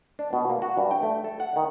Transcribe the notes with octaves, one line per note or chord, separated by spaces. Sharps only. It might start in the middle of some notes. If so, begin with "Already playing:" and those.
D4
B2
A#3
F#4
G2
G5
A3
A4
F#5
D#3